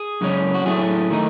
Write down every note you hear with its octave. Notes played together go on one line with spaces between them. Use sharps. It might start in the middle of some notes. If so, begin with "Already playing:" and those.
Already playing: G#4
F#2 C#3 G#3 C#4
F#4
A2 F#3 A3 G#4
D#3 A3 D#4